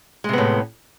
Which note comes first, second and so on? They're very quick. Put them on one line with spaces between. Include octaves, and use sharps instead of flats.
G#3 C3 B3 A2